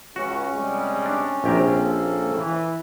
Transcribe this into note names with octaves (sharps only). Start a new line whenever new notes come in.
C#2 C#4 F#4
C3 G3 G#3
D4
A#1 C3 C4 G4 A#4 C5
A#3 C4 A4
E3